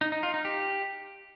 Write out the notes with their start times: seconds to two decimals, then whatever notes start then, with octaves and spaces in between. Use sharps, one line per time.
0.01 D#4
0.12 D#4
0.23 F4
0.34 D#4
0.45 G4